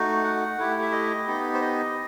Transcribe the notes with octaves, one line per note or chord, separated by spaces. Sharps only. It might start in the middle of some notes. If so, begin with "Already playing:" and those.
Already playing: A3 D#4 F#4
F#5
A3 E4 G4
E5
D#5
B3 D#4 G4
C5
D#5